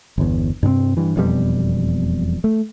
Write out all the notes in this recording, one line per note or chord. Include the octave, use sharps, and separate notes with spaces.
G1 E2
G2 C3 B3 C4
G2 E3
E1 F2 B2 G3
A3